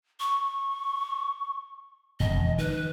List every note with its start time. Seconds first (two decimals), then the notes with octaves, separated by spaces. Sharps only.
0.20 C#6
2.20 E1 F2 C#3 D#5
2.58 D#3 B4